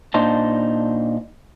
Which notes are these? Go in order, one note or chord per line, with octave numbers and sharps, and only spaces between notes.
A#2 D4 D#4 C5 A5